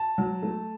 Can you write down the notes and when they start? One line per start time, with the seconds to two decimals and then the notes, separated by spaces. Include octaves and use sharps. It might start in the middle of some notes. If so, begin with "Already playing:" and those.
Already playing: A5
0.18 F#3
0.43 A3